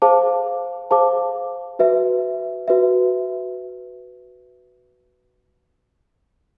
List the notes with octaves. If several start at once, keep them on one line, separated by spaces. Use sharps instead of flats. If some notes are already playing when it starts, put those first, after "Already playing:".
G#4 C5 F5 A5 D6
G#4 C5 F5 A5 D6
F#4 B4 E5
F#4 B4 E5